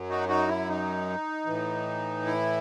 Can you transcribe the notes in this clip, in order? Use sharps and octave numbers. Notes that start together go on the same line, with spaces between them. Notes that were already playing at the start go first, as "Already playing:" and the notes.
Already playing: F#2 F#3
D#4 F#4
D#4 F#4
E4
D#4
A2 E3
E4